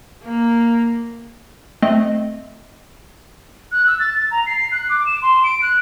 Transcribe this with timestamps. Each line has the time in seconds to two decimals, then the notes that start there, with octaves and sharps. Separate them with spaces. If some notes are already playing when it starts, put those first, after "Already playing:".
0.24 A#3
1.82 A3 C4 D#5
3.72 F#6
3.87 E6
4.00 A6
4.14 A6
4.31 A#5
4.47 C7
4.72 F#6
4.90 D6
5.06 E7
5.22 C6
5.44 D7
5.62 F#6